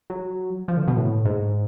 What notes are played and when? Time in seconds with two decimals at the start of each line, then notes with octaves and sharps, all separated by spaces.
0.10 F#3
0.68 F3
0.77 D3
0.87 B2
0.97 A2
1.25 G#2